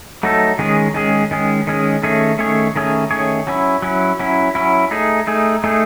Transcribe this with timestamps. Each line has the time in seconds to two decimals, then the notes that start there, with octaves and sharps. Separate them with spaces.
0.23 F#3 A3 D#4 A4
0.59 D#3 G#3 C#4 G#4
0.94 D#3 G#3 C#4 G#4
1.31 D#3 G#3 C#4 G#4
1.67 D#3 G#3 C#4 G#4
2.03 D#3 A3 C#4 G#4 C#5
2.39 D#3 A3 C#4 G#4 C#5
2.76 D#3 A3 C#4 G#4 C#5
3.11 D#3 A3 C#4 G#4 C#5
3.47 F#3 C#4 E4
3.82 F#3 C#4 E4
4.20 F#3 C#4 E4
4.55 F#3 C#4 E4
4.91 A3 D#4 G#4
5.27 A3 D#4 G#4
5.64 A3 D#4 G#4